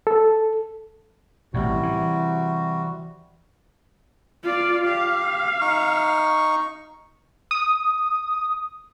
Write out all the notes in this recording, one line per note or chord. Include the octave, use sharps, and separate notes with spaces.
A4
A1 A2 C3 G3 F#4
E3
F4 D5
G4 F5
D#4 C#6
D#6